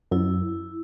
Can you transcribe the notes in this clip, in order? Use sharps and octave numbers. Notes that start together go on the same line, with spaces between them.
F#2 E4